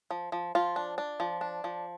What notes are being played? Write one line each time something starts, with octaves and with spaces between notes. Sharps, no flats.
F3
F3
F3 F4
D4
D4
F3
D4
F3